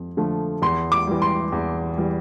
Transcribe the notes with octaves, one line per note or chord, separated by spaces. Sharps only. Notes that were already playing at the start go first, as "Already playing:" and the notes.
Already playing: F2
D3 F3 A3
E2 C6
D6
E3 G3
C6
E2
E3 G3